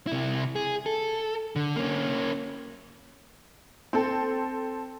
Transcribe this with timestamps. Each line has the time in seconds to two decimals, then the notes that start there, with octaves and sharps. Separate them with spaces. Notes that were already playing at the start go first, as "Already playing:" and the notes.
0.07 C3 E4
0.56 G#4
0.86 A4
1.56 D3
1.76 A#3 C#4
3.93 C4 A4